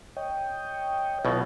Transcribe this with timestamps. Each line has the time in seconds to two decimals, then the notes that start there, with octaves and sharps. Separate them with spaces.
0.17 C#5 D#5 G5
1.25 B1 B2 E4 F4